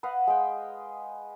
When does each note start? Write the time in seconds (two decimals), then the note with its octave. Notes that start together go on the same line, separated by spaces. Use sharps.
0.03 B4 D#5 F5 F#5
0.27 G#3 G5